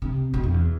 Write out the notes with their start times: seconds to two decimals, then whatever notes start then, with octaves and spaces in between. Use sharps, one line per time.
0.02 C3
0.34 B2
0.44 F2
0.54 E2